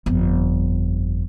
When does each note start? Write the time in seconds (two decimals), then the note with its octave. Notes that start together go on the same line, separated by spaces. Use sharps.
0.06 G1 F2